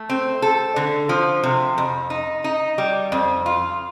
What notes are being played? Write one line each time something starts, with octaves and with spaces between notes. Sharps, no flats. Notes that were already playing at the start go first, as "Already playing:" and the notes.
Already playing: A3
C4
A4
D3
F3
C3
F2
D#4
D#4
G3
F2
F4